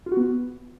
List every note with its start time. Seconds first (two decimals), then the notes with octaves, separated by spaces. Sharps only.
0.06 F4
0.12 F#4
0.17 B3